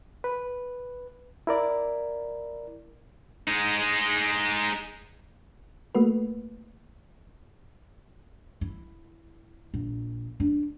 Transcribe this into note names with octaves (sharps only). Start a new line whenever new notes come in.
B4
E4 A#4 D5
G#3 D#4
A3 A#3 F#4 B4
E4
A#1
D4